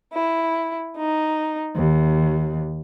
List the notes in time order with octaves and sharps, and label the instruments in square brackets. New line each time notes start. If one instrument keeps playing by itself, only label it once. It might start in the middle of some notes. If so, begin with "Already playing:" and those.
[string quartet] E4
D#4
D#2